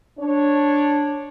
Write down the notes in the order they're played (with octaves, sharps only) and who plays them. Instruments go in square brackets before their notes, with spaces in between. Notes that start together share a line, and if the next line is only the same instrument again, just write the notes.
[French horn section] D4 C#5